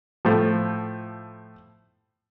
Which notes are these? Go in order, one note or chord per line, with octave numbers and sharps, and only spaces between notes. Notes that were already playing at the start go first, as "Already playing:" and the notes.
A2 F3